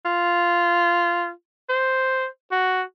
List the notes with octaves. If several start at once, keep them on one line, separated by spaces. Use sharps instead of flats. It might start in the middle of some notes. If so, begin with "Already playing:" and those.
F4
C5
F#4